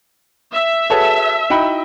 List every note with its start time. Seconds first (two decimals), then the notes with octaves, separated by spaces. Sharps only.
0.52 E5
0.90 F#4 G#4 A4 B4 C#5 A5
1.50 D#4 E4 F#4 D#5 G5 B5